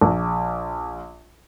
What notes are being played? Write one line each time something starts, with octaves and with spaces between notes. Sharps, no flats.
A#1